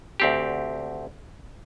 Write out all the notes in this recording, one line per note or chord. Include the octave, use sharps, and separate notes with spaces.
D2 C4 G4